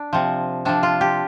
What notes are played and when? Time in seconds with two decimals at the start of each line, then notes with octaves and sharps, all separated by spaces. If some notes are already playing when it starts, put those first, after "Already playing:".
Already playing: D4
0.13 C3 F3
0.65 C3 F3 D4
0.83 F4
1.01 G4